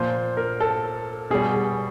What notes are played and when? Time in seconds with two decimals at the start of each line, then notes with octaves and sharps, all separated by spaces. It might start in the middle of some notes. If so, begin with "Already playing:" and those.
Already playing: A#2 F3 C5
0.37 A#4
0.60 A4
1.30 B2 G3 G#4
1.54 G#4